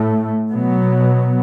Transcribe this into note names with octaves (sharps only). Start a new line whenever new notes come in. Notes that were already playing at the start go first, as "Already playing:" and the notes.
Already playing: A2 A3
B2 F#3 B3